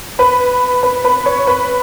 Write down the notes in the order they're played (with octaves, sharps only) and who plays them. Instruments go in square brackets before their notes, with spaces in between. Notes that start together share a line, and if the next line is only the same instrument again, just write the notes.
[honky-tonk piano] B4 B5
B4 B5
B4 B5
C#5 C#6
B4 B5